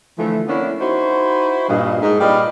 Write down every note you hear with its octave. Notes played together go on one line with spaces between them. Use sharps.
D3 E3 F3 A3
A#3 B3 C#4 D4 E4
D#4 E4 F#4 C5
G2 A#2 D#5
G#2 D#4
A#2 G3 B4 D5 D#5 F5